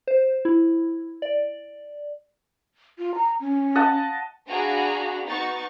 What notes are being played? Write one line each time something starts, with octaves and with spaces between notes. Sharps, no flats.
C5
E4
D5
F4
A#5
C#4
D#5 F#5 A5
D4 F#4 G#4 F5 A#5 B5
B3 D#4 F#4 C#6 A6